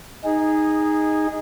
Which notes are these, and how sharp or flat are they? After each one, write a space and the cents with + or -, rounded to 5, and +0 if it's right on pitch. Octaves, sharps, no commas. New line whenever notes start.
D#4 +0 G#4 -15